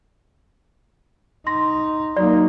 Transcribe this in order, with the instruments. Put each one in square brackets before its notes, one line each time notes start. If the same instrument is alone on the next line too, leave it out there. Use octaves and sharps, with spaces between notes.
[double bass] D#4 [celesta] C6 A#6
[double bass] F#3 A#3 [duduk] D#4 [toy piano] D5